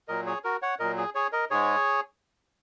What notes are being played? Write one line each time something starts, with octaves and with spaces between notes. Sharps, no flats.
A#2 F#3 A#4 D#5
G#4 C#5
F#4 A#4
C#5 F#5
A#2 F#3 A#4 D#5
G#4
G#4 C#5
A#4 D#5
G#2 G#3 G#4 C#5